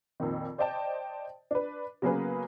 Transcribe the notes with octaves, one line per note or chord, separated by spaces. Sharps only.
F2 A#2 D#3
C5 D5 D#5 G5 A5
D4 B4
C#3 F#3 A#3 B3 G#4 B4